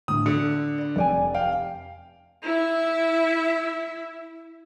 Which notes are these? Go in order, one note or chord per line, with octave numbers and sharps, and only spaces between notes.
A2 D3 D#6
D3 C#7
D5 B5
F1 A4 D5 G5 G#5
F5 G5
E4 E5